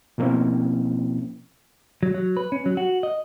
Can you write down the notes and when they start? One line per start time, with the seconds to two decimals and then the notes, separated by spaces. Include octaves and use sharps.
0.18 B2 F3 A#3 C4 C#4 E4
2.03 F#3
2.14 F#3
2.37 B4
2.52 C#4
2.66 F#3
2.77 F#4
3.03 D#5